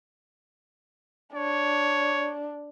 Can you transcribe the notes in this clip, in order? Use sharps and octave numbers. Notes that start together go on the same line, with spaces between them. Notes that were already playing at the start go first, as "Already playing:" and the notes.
D4 C#5